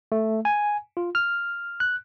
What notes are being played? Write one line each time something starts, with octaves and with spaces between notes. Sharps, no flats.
A3
G#5
F4
F6
F#6